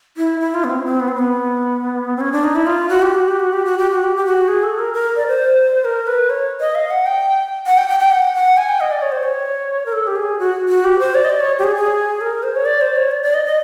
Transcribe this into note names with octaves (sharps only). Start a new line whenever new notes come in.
E4
E4
F4
B3
C4
C#4
C4
B3
C4
B3
C4
C#4
D4
D#4
E4
F4
F#4
G4
F#4
G4
F#4
G4
F#4
G4
F#4
G4
G4
F#4
G#4
A4
A#4
A#4
D5
C5
A#4
B4
C#5
D#5
F5
F#5
G5
F#5
G5
G5
G5
F#5
F#5
G#5
G5
D#5
D5
C#5
C5
C#5
A#4
A4
G4
G#4
F#4
F#4
G4
C5
D5
D#5
D5
C#5
G4
G#4
G#4
A#4
C5
C#5
D5
C5
C#5
D5
D5
D#5
D#5